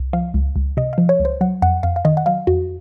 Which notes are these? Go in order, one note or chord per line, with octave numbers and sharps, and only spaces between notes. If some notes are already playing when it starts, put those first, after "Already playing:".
Already playing: C2
F3 F5
C#2
C#2
C3 D#5
F3 F5
C#5
C#2
C5
F#3 F#5
F2 F#5
F2 F5
F5
D#3 D#5
F#5
F#3 F5
F2 F#4